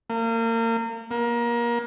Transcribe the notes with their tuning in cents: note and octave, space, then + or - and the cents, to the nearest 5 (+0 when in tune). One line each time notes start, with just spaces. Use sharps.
A#3 -35
A#3 +25